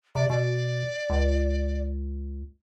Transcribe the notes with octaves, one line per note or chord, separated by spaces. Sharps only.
C3 D5
B2 D5
C#2